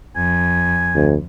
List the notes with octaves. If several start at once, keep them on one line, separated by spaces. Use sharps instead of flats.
F2 G#5
D2